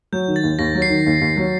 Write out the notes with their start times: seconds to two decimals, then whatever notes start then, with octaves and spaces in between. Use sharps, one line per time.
0.12 F#3 G6
0.28 D#3
0.36 A6
0.43 D#2
0.59 D#2 A#6
0.75 F#3
0.82 C7
0.89 D#3
1.06 D#2
1.21 D#2
1.37 F#3